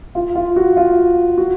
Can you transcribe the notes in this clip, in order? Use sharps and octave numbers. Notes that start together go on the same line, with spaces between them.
F4
F4
F#4
F4
F#4